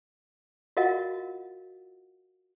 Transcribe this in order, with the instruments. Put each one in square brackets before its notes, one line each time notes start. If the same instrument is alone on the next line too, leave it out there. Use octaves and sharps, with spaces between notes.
[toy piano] F4 F#4 A#4 D#5 F5 F#5